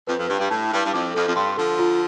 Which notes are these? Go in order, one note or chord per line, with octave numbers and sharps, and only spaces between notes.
F2 B4
F2
G2 B4
G2
A2 A5
G2 E4
G2
F2 D6
F2 A4
F2
G2 C6
D3 F3 A4
F4